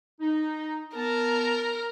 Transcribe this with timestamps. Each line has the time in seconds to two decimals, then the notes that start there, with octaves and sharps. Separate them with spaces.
0.20 D#4
0.96 B3 A#4 A5